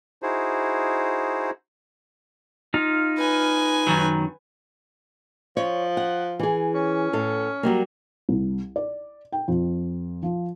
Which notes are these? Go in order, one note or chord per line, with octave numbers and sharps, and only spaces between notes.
D#4 E4 F#4 G#4 C5
D#4 F4 F5
B4 G#5
F#2 D#3 F#3
F3 C#5
F#5
E3 G#4
C#4
A2 A4
F#3 G3 A#3
C2
D5
G5
F2
F3